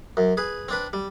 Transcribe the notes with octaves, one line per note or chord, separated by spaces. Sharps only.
F#2
G#4 B4
C4 D4 B4
G3